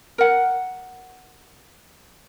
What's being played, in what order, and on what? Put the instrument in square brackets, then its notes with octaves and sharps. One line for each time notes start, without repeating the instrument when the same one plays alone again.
[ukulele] A#4 F#5